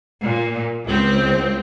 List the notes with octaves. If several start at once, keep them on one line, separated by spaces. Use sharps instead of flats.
A#2
C#2 C4